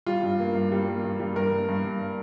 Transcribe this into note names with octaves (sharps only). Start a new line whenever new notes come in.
G3 F4
G2
A#3
G2
G3
A#3
G2
G3
G2 A#4
A#3
G2
G2